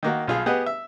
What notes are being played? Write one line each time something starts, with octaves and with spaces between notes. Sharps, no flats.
D#3 A#3 F#4
B1 F4 G#4
B3 G4 G#4 D#5 F#5
E5